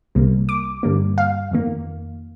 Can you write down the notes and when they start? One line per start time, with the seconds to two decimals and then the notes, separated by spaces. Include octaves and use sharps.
0.15 C2 C3 G3 A#3
0.49 D6
0.83 G2 D3 G3 A#3
1.18 F5
1.51 F2 D#3 A#3